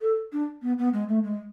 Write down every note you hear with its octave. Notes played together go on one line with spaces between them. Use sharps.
A4
D4
B3
B3
G#3
A3
G#3